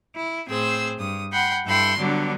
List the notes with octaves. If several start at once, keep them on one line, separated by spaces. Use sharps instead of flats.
E4
A2 C4 G#4 C5 E6
G2 D#6
F#5 G5 B5 C6
G2 E4 A4 G5 B5 C6
D3 F#3 G3 B3 D4